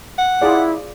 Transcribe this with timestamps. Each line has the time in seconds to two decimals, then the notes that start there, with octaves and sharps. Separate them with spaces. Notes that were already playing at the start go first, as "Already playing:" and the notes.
0.18 F#5
0.42 E4 F4 G#4 D5